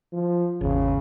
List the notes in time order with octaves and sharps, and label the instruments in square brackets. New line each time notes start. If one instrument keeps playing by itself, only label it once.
[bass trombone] F3
[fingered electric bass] G#1 E2 [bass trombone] C#3